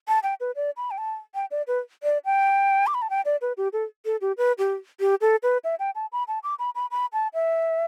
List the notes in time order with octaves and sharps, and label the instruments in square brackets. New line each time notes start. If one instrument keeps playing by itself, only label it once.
[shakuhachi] A5
G5
B4
D5
B5
G5
A5
G5
D5
B4
D5
G5
D6
B5
A5
G5
D5
B4
G4
A4
A4
G4
B4
G4
G4
A4
B4
E5
G5
A5
B5
A5
D6
B5
B5
B5
A5
E5